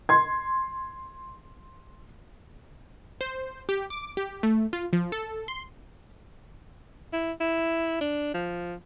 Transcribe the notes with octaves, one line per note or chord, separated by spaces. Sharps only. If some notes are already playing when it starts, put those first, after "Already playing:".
C6 G#6
C5
G4
D6
G4
A3
F4
F3
A4
C6
E4
E4
D4
F3